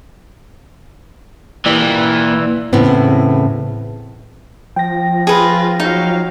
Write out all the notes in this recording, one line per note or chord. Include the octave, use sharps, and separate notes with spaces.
E3 A#3 D5 G5
E2 A2 C#3 B3 C4
F3 G5 A#6
F4 G#4 B4
F#3 D#4 F5